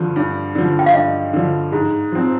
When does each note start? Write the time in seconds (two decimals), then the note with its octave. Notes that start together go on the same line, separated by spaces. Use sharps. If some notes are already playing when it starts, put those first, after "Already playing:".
Already playing: G2 D3 F3
0.16 G2
0.55 D3 F3
0.79 G5
0.86 F5
0.94 G2 D#5
1.33 D3 F3
1.72 G#2
2.12 F3 C4